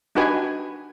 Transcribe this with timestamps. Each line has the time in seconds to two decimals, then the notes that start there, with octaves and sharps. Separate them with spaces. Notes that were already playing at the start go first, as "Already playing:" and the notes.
0.15 D4 D#4 F#4 G4 B4 G#5